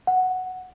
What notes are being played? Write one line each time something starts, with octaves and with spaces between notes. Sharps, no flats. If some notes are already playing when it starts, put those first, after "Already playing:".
F#5